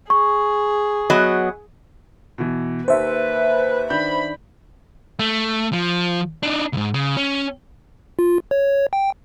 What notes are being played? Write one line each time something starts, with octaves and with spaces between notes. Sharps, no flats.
G#4 C#6
F#3 B3 D#5
B2 E3
D#2 A#3 B4 C5 E5
D#3 D4 B5 G6
A3
F3
D4 D#4
C#2 G#2
C#3
C#4
F4
C#5
G5